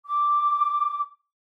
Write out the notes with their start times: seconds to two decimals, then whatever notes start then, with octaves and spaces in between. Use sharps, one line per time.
0.06 D6